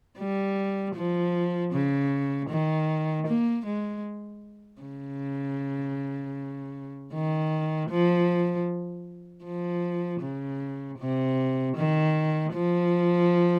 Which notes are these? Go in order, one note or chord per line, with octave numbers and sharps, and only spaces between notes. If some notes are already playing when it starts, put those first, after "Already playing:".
G3
F3
C#3
D#3
A#3
G#3
C#3
D#3
F3
F3
C#3
C3
D#3
F3